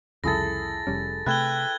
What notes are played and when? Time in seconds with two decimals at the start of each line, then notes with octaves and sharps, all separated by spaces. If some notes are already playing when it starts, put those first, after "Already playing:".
0.24 C2 F2 C#3 E4 G#4 A4 A6 A#6
0.87 F1 G3 C#4
1.26 C3 A3 B4 E5 G5 F#6 G#6 G7